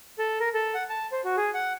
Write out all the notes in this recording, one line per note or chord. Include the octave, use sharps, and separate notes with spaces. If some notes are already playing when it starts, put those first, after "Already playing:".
A4
A#4
A4
F#5
A5
C5
F#4
G#4
F#5